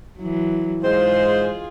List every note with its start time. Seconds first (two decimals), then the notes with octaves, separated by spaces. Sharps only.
0.19 E3 F#3
0.84 G#2 G#3 F4 G#4 C5